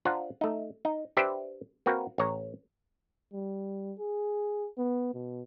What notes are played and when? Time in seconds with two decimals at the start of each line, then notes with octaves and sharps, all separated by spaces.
0.05 D4 F4 C5 F#5 A#5
0.41 A3 D#4
0.85 D#4
1.17 D4 G4 B4 C5 E5
1.86 A#3 C4 F#4 A#4 B4
2.18 A1 C#5 A#5
3.33 G3
3.99 G#4
4.78 B3
5.14 B2